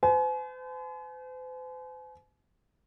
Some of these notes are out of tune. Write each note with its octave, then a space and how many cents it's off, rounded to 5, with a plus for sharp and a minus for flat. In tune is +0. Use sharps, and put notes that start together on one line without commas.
C5 -45 G#5 +40